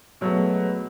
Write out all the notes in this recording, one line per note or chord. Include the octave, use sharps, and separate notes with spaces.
B2 F#3 G#3 A3 B3